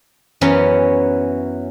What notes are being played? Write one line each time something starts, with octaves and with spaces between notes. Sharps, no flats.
F#2 E3 F#3 B3 C#4